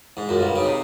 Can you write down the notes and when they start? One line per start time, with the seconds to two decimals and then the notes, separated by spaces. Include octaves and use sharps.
0.17 G#2
0.25 F#2 F4
0.41 G2
0.56 C#3 D#4
0.64 C3